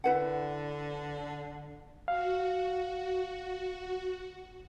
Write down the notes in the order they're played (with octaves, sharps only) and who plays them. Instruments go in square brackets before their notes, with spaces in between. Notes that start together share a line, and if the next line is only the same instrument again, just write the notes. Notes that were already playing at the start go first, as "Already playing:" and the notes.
[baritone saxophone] D3 [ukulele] E4 B4 F#5
[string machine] F#4 [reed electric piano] F5